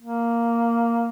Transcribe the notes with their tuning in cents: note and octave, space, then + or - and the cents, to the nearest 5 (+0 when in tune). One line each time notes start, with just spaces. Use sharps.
A#3 +0